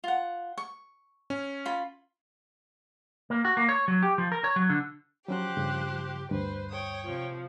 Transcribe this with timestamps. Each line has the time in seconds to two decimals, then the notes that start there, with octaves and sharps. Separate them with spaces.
0.04 F4 F#5
0.58 C#6
1.30 C#4
1.66 F4 B5
3.30 A#3
3.45 F#4
3.57 A#3
3.69 C#5
3.88 F#3
4.02 G4
4.18 F3
4.32 A#4
4.44 C#5
4.56 F#3
4.70 D3
5.28 F3 F#3 C#4 F#4 G4 C5 G5 F#6
5.57 G2 C#3
6.31 D2 G2 B4 C5
6.70 C#5 G5 D#6
7.06 C3 F3